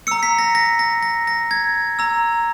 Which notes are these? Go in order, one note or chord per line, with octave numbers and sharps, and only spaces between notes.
A#5 E6 C#7
B6
A#6
A#6
A#6
A#6
A#6
G#6
A#5 E6